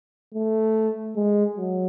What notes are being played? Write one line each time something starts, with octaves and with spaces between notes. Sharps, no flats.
A3
G#3
F#3